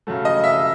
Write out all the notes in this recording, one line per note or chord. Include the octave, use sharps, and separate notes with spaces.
C#3 F#3 A3
D#5
E5